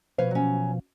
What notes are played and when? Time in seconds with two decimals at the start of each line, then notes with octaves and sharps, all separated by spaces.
0.18 B2 F3 B4 C#5 F5
0.31 F#3 C#4